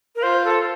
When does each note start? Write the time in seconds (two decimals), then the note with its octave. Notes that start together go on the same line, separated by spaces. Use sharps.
0.16 A#4
0.22 F4 C5
0.44 A4